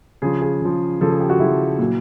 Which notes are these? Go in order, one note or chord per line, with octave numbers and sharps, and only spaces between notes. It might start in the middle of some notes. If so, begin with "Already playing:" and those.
C#3 F3 G#4
G#4
C#3 F3
C#3 F3 A4
G#4
G4
F#4
C#3 F3 E4
A#2 F#3